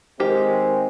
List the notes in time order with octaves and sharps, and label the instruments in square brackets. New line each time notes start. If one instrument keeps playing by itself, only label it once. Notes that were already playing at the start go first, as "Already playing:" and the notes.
[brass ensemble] D#3 G#3 C4 [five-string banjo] G4 A#4 [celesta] C5